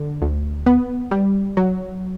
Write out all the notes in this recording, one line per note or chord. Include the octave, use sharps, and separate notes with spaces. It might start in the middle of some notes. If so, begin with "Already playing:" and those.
Already playing: D3
D2
B3
G3
F#3